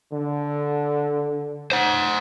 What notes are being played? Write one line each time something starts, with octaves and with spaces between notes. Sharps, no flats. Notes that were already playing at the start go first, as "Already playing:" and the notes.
D3
C5 F#5